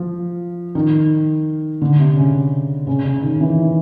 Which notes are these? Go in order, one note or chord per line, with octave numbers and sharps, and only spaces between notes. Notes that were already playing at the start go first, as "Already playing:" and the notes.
Already playing: F3
D#3
D3
C3
C#3
C#3
C#3
D#3
E3